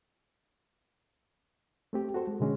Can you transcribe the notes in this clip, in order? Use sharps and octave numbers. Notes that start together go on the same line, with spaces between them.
A3 C4 G4
F#4 A4 C5
G#3
B2 D3 G#3 C#4